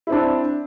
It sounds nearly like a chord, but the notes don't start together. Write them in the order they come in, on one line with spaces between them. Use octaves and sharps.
E4 C4 D4